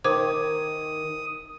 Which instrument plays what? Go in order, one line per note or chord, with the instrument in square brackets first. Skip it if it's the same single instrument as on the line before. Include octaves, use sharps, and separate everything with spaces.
[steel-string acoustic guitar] D#3 [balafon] C5 D6 [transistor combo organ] D#6